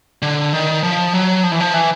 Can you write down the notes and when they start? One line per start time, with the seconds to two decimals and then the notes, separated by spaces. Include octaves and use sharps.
0.22 D3
0.53 D#3
0.83 F3
1.13 F#3
1.43 F3
1.52 E3
1.60 F3
1.74 E3